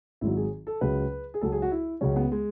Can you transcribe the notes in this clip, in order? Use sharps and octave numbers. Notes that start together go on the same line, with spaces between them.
G#1 G#2 D#3 F#3 E4
G#4
A4
C#2 C#3 F#3 B4
G#4
C#2 C#3 F#3 A4
G#4
F#4
E4
C#2 C#3 F#3 C#4
B3
G#3